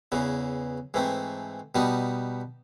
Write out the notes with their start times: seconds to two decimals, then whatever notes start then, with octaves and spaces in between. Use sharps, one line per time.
0.12 E2 C#3 E3
0.94 G#2 E3 A3 C4
1.75 B2 G3 B3 D#4